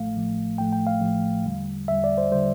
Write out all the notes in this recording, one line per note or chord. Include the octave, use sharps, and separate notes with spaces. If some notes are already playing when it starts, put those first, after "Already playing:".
Already playing: A1 A2 F3 A3 F5
A1 A2 F3 A3
A1 A2 F3 A3 G5
G5
F5
A1 A2 F3 A3
E2 D3 G3
E2 D3 G3 E5
D5
C5
D3 G3 C5